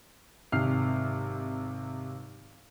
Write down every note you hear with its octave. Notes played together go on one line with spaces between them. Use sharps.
G#1 C3 F6 C7